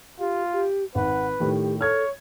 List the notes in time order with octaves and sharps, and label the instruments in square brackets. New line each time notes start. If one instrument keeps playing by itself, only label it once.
[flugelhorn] F4 [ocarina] G4
[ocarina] G4
[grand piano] G#1 [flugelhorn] B4 [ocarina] F#5
[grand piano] A2 D#3 [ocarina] G4
[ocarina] A4 [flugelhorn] C#5 [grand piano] F6 G#6